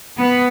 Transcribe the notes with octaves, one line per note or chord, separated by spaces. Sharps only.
B3